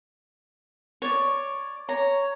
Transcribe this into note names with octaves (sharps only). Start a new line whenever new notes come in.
C#5 D5
C#5 A#5